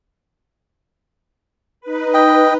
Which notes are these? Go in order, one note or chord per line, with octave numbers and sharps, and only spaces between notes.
D#4 B4
D#5 G5